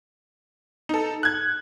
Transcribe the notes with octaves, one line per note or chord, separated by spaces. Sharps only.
D#4 A4
F#6 G#6